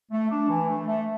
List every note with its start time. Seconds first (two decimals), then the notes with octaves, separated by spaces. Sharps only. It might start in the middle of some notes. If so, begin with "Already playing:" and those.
0.11 A3
0.31 D4
0.49 E3
0.69 A3
0.87 A3